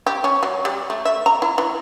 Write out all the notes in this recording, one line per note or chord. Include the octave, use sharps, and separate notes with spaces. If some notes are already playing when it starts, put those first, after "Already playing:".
G4
C#4
F#3
G3
A3
E5
A#5
E4
E3